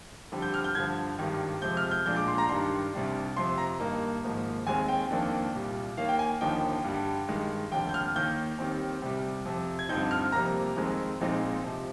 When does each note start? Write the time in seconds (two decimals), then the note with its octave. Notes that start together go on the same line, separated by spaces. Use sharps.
0.32 F2 D3 G3
0.42 G6
0.54 F6
0.64 G6
0.75 G2 D3 F3 G#6
1.18 G#1 G2 D#3 G3
1.62 F2 C3 F3 G#3 G6
1.77 F6
1.91 G6
2.06 A#1 A#2 G#3 D4 G6
2.16 D6
2.28 C6
2.38 A#5
2.49 G2 D#3 G3 D4 C6
2.93 C2 C3 G3 D4
3.37 F2 C3 F3 C6
3.58 A#5
3.80 G2 D#3 A#3 D#4
4.24 G#1 G#2 F3 A#3
4.67 D#2 D#3 G#3 C4 G#5
4.88 G5
5.10 F2 D#3 A#3 D4
5.54 C2 A#2 G3
5.97 D#2 D#3 A#3 F5
6.09 G5
6.19 G#5
6.41 D#2 D3 F3 A#3 D#4 G5
6.84 G2 D3 G3
7.29 G2 D#3 G#3
7.72 F1 D#2 D3 G5
7.89 G6
7.94 F6
8.15 D#2 D#3 A#3 G6
8.59 D#2 D#3 G3 C4
9.02 C2 C3 G3
9.45 F2 C3 F3
9.79 G#6
9.89 G2 D3 F3 C4 D#4 G6
10.11 F6
10.32 F2 C3 G3 A#3 A#5
10.76 F2 D#3 G#3 C4
11.21 A#1 A#2 G#3 C4 D#4
11.64 C3 F3